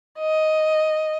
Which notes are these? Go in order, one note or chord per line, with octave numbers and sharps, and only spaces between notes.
D#5